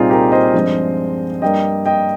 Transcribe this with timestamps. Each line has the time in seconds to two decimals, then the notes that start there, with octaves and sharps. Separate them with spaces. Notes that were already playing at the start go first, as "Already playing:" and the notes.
Already playing: C2 A#2 G3 C4 D#4 F4 G#4
0.10 G4 A#4
0.32 C5 D#5
0.54 G2 F3 G#3 C4
1.42 G2 G3 A#3 D#5 G5
1.86 D#5 G5